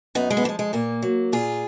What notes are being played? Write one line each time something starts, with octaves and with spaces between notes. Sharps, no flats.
F#2 B3 D#4
G#3
B3
F3 G#3 A#3
G#3
A#2 A#3
F#3
A#2 F4 G#4